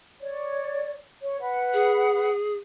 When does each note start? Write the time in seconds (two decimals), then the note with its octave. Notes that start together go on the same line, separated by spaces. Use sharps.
0.21 C#5 D5
1.23 C#5
1.41 B4 F#5
1.73 G#4